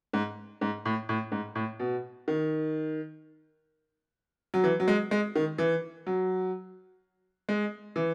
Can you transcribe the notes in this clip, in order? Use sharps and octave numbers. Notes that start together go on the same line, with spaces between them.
G#2
G#2
A2
A2
G#2
A2
B2
D#3
F#3
E3
F#3
G#3
G#3
D#3
E3
F#3
G#3
E3